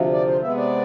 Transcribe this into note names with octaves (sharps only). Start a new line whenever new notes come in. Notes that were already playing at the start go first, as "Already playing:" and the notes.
Already playing: D2 C3 F3
D5
C5
C3 G#3 B3 E5
D5